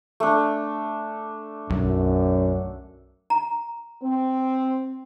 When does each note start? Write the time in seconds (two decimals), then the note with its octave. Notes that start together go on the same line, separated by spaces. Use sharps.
0.20 A3 D4
1.70 B1 F#2
3.30 A#5
4.03 C4